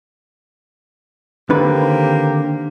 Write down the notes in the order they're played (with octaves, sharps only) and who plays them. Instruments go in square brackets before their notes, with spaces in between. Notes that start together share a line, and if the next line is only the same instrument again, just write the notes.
[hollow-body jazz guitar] D3 D#3 B4 [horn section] A#3 C4 G4